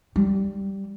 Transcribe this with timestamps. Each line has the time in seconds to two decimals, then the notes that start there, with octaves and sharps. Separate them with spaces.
0.16 G3